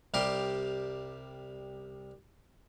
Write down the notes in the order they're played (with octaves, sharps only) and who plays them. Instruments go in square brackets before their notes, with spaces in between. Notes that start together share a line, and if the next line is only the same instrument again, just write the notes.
[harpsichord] C2 G3 G4 A#4 G5 C6